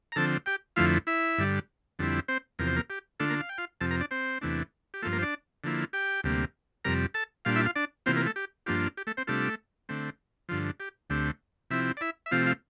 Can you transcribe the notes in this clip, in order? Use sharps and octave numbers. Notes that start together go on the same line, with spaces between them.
A#5
D3 F3 C4 A4 A5
G4 G5
F2 D3 F3 A3 E4 F4 F5
E4 E5
G2 D3 G3
F2 D3 G3 C4 E4
C4 C5
E2 C3 F3 A#4
C5
A#3 A#4
G4
D3 A3 D4 F4 A4
A#3 A#4
F5
G5
F4 F5
F2 C3 F3 A4 A5
A#4 A#5
D4 D5
C4 C5
E2 C3 E3 A3 D4
G4
G2 F3 A3 A#3 F4 A4
A#3 A#4
C5
D4 D5
D3 F3 A#3 E4
G4 G5
D2 C3 G3 A#3
F2 C3 G3 A#4 A#5
A4 A5
A#2 G3 D4 F4 F5
E4 E5
F4 F5
D4 D5
C3 E3 A#3 C4 F4 C5
A#3 A#4
A3 A4
G4
G2 F3 A#3 D4 F4 G4
G4
A3 A4
C4 C5
C3 G3 A3 D4 F4 A4
D3 A3 C4
G2 D3 F3 F4
G4
D2 D3 A3 C4 G4
C3 F3 C4 E4 E5
D5
E4 E5
E5
C3 F3 A3 C4 F4 F5
F4 F5